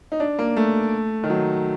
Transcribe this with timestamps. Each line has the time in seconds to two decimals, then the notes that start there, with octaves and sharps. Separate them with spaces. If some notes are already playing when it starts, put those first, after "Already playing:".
0.12 D#4
0.20 D4
0.39 A#3
0.56 A3
1.24 D#3
1.30 F#3